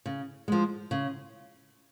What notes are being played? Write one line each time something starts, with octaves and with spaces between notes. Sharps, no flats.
C#3
F3 G#3
C#3